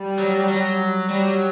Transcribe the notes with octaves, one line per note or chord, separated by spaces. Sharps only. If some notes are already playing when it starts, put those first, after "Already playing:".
Already playing: G3
F#3
F#3
F#3 G3